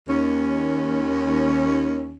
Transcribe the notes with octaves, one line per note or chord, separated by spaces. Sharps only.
D#2 C#4